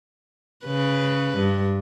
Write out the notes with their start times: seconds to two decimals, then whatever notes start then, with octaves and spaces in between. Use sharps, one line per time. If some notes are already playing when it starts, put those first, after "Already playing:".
0.65 C#3 B4
1.38 G2